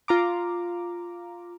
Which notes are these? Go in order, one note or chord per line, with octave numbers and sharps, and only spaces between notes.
F4 A#5 D6